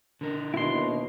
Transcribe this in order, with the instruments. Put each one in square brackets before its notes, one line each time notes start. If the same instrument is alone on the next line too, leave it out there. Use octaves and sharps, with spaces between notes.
[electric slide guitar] D3 A#4
[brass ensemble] D#2 B2 [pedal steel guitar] E4 C6